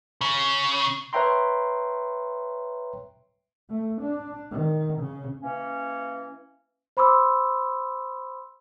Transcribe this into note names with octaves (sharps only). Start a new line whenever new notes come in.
C#3
B4 C#5 E5 G5 A#5 C6
A3
D4
D#3
C#3
E3 A#3 C#4
C5 B5 C6 D6 E6